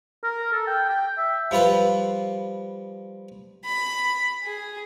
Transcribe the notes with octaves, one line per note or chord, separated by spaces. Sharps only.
A#4
A4
G5
G5
E5
F3 G3 F4 B4 C5
B5
G#4